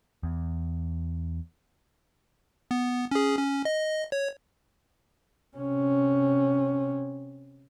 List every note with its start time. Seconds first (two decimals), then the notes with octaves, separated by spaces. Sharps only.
0.23 E2
2.71 B3
3.11 C#4 G#4
3.37 C#4
3.65 D#5
4.12 C#5
5.57 C3 C#4